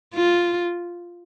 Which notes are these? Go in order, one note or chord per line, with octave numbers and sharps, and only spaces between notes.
F4